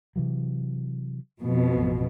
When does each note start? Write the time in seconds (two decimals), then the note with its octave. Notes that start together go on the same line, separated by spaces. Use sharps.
0.16 C3 E3 F#3
1.40 F2 B2
1.75 A1